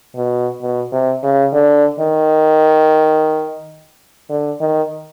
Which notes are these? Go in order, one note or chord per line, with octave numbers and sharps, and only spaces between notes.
B2
B2
C3
C#3
D3
D#3
D3
D#3